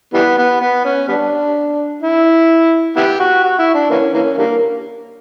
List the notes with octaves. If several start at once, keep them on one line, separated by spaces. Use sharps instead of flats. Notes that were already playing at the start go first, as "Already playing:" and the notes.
E3 G3 B3
B3
B3
C#4
G3 B3 D4
E4
B3 E4 G4
F#4
F#4
E4
D4
E3 A#3 C#4
E3 A#3 C#4
D3 G3 A#3